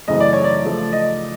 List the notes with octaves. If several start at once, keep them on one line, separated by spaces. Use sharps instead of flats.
F#2 C#3 E3 A3 C4 D#5
D5
C#5
D5
C#3 F3 A3
D#5